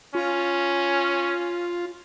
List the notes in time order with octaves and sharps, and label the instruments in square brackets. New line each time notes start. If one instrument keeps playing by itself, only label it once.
[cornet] C#4 [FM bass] F4